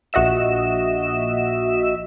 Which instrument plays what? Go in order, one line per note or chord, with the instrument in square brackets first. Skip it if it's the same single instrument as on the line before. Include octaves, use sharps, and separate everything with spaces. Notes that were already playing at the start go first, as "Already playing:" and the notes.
[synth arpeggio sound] A#1 F#4 D#5 E5 E7